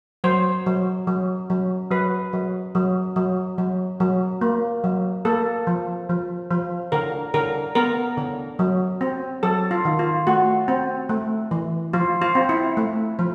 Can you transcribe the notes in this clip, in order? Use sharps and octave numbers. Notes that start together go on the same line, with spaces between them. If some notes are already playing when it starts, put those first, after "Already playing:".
F#3 C5
F#3
F#3
F#3
F#3 B4
F#3
F#3
F#3
F#3
F#3
A#3
F#3
A#3 A4
F3
F3
F3
D3 A#4
D3 A#4
B3 A#4
D3
F#3
C4
F#3 A4
F4
D#3
F4
A3 F#4
C4
A3
E3
F3 F4
F4
C4
E4
A3
F3